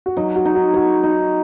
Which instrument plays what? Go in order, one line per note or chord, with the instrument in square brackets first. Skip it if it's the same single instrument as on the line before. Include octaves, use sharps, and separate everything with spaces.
[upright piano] F#4
[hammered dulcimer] F#3 [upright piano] D#4
[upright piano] F#4
[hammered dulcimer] D#4
[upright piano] F#4
[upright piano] F#4 [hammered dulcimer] C#5
[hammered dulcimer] D#4